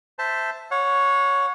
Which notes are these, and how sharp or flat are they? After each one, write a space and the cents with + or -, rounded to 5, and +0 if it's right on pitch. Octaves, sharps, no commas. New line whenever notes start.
C5 -10 E5 +0 A5 +0
C#5 +5 F#5 -30